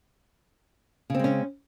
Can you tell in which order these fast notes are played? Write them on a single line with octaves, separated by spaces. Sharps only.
C#3 C4 G#3 C#4